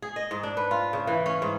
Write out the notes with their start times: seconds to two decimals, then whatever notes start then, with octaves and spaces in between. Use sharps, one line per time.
0.02 G#4
0.16 D#5
0.31 G#2
0.43 D4
0.57 B4
0.71 F4
0.93 C#3
1.07 E3
1.26 C#4
1.42 G#2